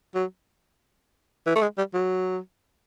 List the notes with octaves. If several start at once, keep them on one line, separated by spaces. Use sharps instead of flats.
F#3
E3
A3
G#3
G3
F#3